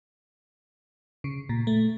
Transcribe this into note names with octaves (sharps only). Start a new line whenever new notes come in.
C#3
A#2
A3